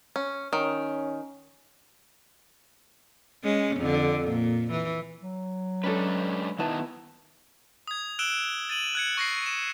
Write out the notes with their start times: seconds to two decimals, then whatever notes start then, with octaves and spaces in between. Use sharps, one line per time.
0.16 C#4
0.53 D#3 C#4
3.44 G#3 C#4
3.77 F2 D3
4.28 A#2
4.71 E3
5.21 F#3
5.84 G#3 C#4 D4 A4 B4
6.59 D#3 B3 D#4 E4 B4 A5
7.87 D#6 G#6
8.19 E6 F#6 D7 E7 G7
8.69 A6 D#7 F#7
8.95 F#6 G#6 C#7
9.17 C#6 A#6 C7
9.46 E7